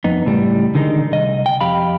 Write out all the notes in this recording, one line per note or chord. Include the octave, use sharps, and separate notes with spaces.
F2 B3 D#4
C#2 A2 G3
D3 D#3 G#3 D#4
C2 D#5
G5
F2 G4 F5 B5